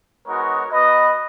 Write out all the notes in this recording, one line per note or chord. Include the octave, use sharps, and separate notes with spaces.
G#3 B3 D#4 F#4 A#4 C#5
B3 F#4 B4 D#5